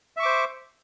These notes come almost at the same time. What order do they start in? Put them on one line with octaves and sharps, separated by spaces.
E5 C#6 D6 C5